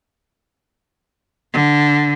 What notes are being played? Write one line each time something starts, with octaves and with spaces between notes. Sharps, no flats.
D3